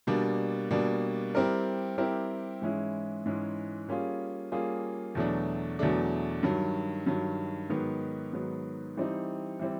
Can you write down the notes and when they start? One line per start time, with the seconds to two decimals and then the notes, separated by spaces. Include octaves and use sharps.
0.07 B2 G3 A#3 D4
0.71 B2 G3 A#3 D4
1.35 G3 C4 E4 G4 A#4
1.98 G3 C4 E4 G4 A#4
2.62 G#2 E3 G#3 C#4 E4
3.26 G#2 E3 G#3 C#4 E4
3.89 G3 A#3 C#4 F4 G#4
4.52 G3 A#3 C#4 F4 G#4
5.15 E2 B2 F#3 A3 D4
5.79 E2 B2 F#3 A3 D4
6.43 G2 D#3 F#3
7.06 G2 D#3 F#3
7.70 G#2 D#3 F#3 B3
8.33 G#2 D#3 F#3 B3
8.97 E3 G3 C4 D#4
9.59 E3 G3 C4